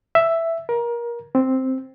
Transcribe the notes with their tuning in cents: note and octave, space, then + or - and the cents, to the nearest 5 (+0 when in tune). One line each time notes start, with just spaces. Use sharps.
E5 +5
A#4 +25
C4 +0